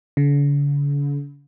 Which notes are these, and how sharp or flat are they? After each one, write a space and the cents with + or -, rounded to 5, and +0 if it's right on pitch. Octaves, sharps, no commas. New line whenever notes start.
D3 -45